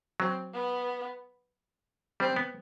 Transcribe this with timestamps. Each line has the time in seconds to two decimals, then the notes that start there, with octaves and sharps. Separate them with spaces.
0.20 F#3 C4
0.54 B3
2.20 G3 C4
2.36 B3